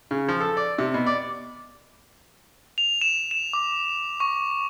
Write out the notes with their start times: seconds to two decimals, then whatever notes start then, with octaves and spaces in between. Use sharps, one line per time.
0.11 C#3
0.28 F3
0.40 A4
0.57 D5
0.79 C3
0.94 B2
1.06 D5
2.78 F7
3.01 E7
3.31 E7
3.53 D6
4.20 C#6